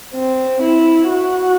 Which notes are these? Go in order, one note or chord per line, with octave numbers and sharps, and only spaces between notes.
C4
E4
F#4